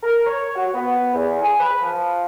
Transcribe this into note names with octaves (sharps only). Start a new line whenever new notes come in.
A#4
C#5
F#4
B3
E2
G#4
B4
F3